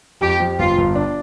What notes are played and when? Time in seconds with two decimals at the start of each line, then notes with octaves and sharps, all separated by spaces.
0.21 F2 G4
0.40 F3
0.59 G1 F4
0.78 G1
0.95 D4